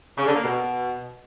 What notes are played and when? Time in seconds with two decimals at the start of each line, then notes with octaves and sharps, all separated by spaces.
0.17 C#3
0.26 D3
0.35 A#3
0.44 B2